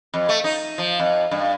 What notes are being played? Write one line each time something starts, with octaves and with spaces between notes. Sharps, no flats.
F2
A3
D#4
F3
F2
G2